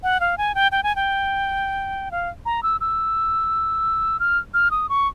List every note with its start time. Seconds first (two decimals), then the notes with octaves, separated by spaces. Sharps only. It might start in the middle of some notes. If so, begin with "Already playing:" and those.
0.03 F#5
0.20 F5
0.38 G#5
0.55 G5
0.72 G5
0.83 G#5
0.96 G5
2.11 F5
2.46 A#5
2.63 E6
2.81 E6
4.20 F6
4.54 F6
4.71 D#6
4.89 C#6